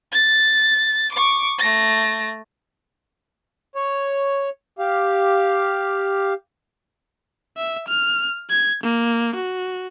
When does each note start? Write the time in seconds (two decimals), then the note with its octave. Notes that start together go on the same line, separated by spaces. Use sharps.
0.12 A6
1.12 C#6 D6
1.59 A3 A#6
3.75 C#5
4.79 G4 F5
7.57 E5
7.89 F6
8.50 G#6
8.84 A#3
9.36 F#4